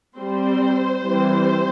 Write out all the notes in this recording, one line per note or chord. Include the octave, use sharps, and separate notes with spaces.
G3 C4 C5
E3 G3 C4